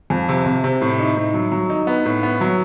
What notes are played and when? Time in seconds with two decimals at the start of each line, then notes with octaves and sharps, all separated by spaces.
0.10 F2
0.29 C3
0.46 C3
0.64 C3
0.82 A2
0.99 D#4
1.17 A2
1.34 F#3
1.52 F#3
1.70 D#4
1.87 B3
2.06 A2
2.23 B3
2.41 F#3